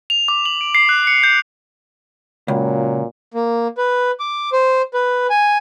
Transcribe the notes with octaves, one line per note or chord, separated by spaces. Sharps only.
F7
D6
F#7
D7
C7
F#6
C#7
G6
C#2 A#2 F#3
A#3
B4
D6
C5
B4
G#5